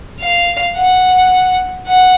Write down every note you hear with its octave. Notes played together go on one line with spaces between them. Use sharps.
F5
F#5
F#5